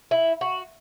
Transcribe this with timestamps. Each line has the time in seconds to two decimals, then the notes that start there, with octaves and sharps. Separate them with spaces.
0.11 E4
0.41 F#4